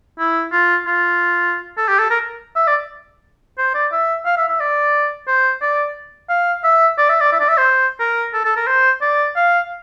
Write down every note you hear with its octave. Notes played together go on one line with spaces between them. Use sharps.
E4
F4
F4
A4
G4
A4
A#4
E5
D5
C5
D5
E5
F5
E5
E5
D5
C5
D5
F5
E5
D5
E5
D5
E5
D5
E5
C5
A#4
A4
A4
A#4
C5
D5
F5